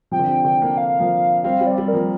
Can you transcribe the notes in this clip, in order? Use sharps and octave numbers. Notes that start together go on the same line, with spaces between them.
C3 F3 G5
D3
C3
D3 G5
A#3 D4
F5
F3 A#3
G3 C4 F5
G3 C4
D5
G3 C4
A#4
F3 A#3